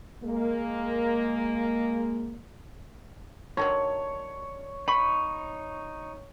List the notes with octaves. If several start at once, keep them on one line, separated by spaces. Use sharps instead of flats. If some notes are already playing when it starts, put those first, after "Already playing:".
G#3 A#3
D3 D#3 F#3 C#5
D#4 B5 C#6